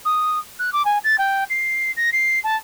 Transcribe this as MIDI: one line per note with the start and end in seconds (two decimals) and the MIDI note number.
0.05 0.39 87
0.59 0.72 90
0.73 0.85 86
0.85 0.98 80
1.04 1.16 93
1.18 1.44 79
1.50 1.91 96
1.96 2.10 94
2.13 2.39 96
2.44 2.56 81